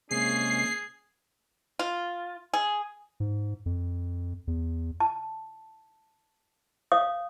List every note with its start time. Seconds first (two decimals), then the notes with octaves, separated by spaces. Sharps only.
0.11 C3 G#3 A#3 C#4 G#4 C7
1.79 F4
2.53 G#4
3.20 G#2
3.66 F2
4.47 E2
5.00 A5
6.92 C#5 F5 D#6